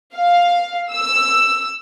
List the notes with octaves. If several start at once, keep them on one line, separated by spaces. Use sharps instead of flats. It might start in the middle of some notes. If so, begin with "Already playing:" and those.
F5
E6